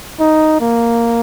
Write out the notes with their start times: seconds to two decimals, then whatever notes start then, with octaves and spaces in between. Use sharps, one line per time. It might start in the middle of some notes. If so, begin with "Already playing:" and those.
0.20 D#4
0.61 A#3